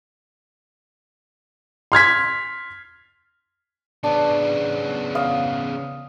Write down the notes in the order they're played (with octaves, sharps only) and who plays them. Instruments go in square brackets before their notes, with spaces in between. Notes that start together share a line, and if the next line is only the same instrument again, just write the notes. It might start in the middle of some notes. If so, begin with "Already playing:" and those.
[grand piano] C6 F6 G#6 B6
[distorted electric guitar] C#3 B3 [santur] D4
[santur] F5 D#6